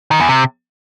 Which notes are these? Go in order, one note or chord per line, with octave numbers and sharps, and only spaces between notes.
D#3
E2
C3